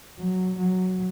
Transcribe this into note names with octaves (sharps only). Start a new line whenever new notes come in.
F#3
F#3